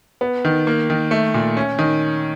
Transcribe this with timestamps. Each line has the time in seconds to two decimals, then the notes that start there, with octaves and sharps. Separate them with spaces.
0.21 B3
0.45 D#3
0.67 A#3
0.90 D#3
1.11 A3
1.34 A#2
1.57 C#4
1.79 D#3